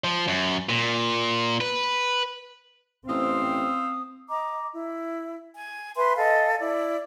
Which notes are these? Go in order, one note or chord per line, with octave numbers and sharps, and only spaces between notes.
F3
F#2
A#2
B4
A1 C4 C5 F5 D#6 E6
D#5 A#5 D6
E4
G#5
B4 E5 G#5 C6
A4 D#5 F5 G#5
E4 D5